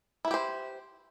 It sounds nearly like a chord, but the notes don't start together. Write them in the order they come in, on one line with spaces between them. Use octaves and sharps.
E4 B4 G4 C5